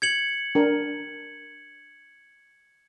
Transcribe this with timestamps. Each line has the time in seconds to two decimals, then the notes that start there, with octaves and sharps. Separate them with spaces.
0.02 G#6 C#7 F#7
0.55 D4 A#4